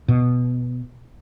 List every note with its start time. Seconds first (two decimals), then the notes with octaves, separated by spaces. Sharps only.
0.08 B2